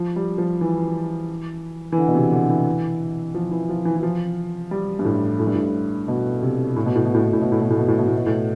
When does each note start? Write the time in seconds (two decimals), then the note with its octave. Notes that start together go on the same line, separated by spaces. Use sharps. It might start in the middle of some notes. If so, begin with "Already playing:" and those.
Already playing: F3
0.16 G3
0.38 F3
0.61 E3
1.92 E3
1.98 D3
2.08 B2
2.15 C3
2.32 D3
2.50 E3
3.34 F3
3.51 E3
3.69 F3
3.85 E3
3.96 E3
4.03 F3
4.71 G3
4.99 G2
5.05 A2
5.40 A2
5.47 G2
5.55 A2
6.08 B2
6.42 C3
6.76 A2
6.86 B2
6.95 A2
7.05 B2
7.14 A2
7.23 B2
7.33 A2
7.41 B2
7.52 A2
7.61 B2
7.70 A2
7.79 B2
7.88 A2
7.99 B2
8.08 A2
8.17 B2
8.26 A2